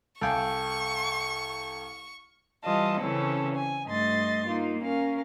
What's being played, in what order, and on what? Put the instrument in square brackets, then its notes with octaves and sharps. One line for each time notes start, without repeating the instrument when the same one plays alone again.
[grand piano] C2 F5 G#5 [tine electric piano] A4 G5 [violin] C#6
[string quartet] E3 G3 F4 D#5 A5
C#3 E3 C4 C#4 E4 A4
G#5
G2 A3 D#5 C6 A6
A#3 D#4 F4
C#4 A#4 F5